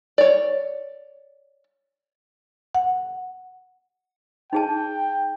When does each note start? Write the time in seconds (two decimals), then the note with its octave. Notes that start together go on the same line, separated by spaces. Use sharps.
0.18 C#5 D5
2.75 F#5
4.53 D#4 G#4 G5 A5